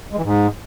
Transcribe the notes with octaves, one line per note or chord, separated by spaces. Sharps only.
G#3
E3
G#2